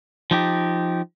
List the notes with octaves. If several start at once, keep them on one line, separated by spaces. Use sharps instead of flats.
F3 D#4 G4